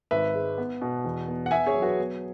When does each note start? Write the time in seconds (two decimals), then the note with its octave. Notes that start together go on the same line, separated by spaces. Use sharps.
0.11 G#1 B4 E5
0.35 G#3
0.58 B3
0.82 B2
1.05 E2
1.28 B3
1.46 F#5
1.51 B3 E5 G#5
1.66 G#4 C#5
1.74 F#3
1.82 F#4 B4
1.99 B3